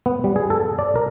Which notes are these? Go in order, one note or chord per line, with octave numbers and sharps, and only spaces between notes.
B3
G3
G#4
A4
D5
A#4